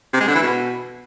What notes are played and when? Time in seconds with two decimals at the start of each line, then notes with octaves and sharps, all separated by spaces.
0.13 C3
0.20 G#3
0.28 D3
0.35 E3
0.42 B2